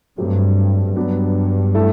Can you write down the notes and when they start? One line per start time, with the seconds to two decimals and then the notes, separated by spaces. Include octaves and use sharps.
0.18 G2 F#3 A3 C4 G4
0.96 G2 F#3 B3 D4
1.74 A3 E4 A4